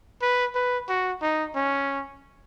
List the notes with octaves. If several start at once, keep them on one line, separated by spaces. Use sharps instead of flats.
B4
B4
F#4
D#4
C#4